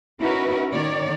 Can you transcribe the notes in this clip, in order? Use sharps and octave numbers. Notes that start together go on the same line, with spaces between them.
C#4 D#4 E4 F#4 A#4 B4
D#3 C#5 D5